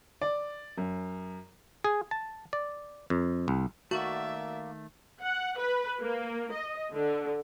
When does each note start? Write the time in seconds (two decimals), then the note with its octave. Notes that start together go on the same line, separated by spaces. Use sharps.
0.21 D5
0.78 F#2
1.84 G#4
2.11 A5
2.53 D5
3.10 F2
3.48 C2
3.91 D#3 A3 A#3 F#4 D5 E5
5.21 F#5
5.58 B4
6.01 A#3
6.51 D#5
6.93 D3